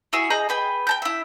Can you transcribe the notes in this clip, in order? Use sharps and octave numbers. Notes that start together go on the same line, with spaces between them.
E4 F#4 G#4 E5
G#4 D#5 A#5 G6
G#4 B4 G5
G5 A5 G6
E4 E5